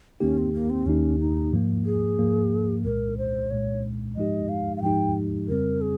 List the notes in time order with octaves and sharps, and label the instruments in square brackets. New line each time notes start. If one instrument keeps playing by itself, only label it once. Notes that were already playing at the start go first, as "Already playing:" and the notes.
[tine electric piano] D#2 D#3 A#3 D#4 G4 [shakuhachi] C#4
[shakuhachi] C4
A#3
C4
[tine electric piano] D#2 D#3 A#3 D#4 G4 [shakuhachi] C#4
[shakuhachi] D#4
[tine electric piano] G#2 F3 A#3
[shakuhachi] G#4
[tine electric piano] G#2 F3 A#3
[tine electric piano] C2 A#2 G#3 [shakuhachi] A#4
[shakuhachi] C5
[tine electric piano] C2 A#2 G#3 [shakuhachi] C#5
[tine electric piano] G#2 F3 G#3 D#4 G4 [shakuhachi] D#5
[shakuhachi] F5
F5
[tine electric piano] G#2 F3 G#3 D#4 G4 [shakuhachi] G5
[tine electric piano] F2 C#3 G3 C4 [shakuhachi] A#4
[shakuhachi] G#4